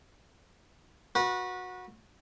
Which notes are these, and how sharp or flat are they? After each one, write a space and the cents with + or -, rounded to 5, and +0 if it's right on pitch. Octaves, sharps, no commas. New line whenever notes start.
F#4 -20 B4 -25